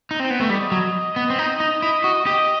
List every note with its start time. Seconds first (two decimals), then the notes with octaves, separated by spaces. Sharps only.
0.11 D#4
0.20 C4
0.30 B3
0.40 A3
0.50 G3 D#5
0.71 F#3
1.16 B3
1.30 C4
1.38 D#4
1.60 D#4
1.82 E4
2.04 F#4
2.26 G4 D#5